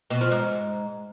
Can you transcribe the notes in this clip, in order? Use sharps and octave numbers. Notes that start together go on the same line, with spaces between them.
B2
F3
G#2